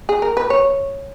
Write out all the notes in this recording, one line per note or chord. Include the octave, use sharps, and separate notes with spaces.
G#4
A#4
B4
C#5